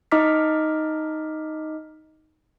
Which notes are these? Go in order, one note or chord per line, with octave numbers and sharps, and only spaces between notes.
D#4 D#5 A#5 D6 F6 B6